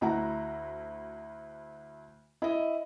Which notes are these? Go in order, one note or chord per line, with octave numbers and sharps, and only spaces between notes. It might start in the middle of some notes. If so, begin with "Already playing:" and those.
D2 E4 F#4 F#5 A#5
E4 D#5